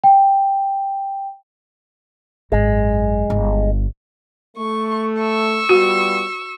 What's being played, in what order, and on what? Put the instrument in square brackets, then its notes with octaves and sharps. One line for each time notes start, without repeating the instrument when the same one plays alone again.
[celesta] G5
[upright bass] G#1 F#2 [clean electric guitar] G#3
[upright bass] G1
[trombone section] A3 [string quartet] C#6
[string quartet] C#6 E6
[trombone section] G3 B3 F4 [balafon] F#4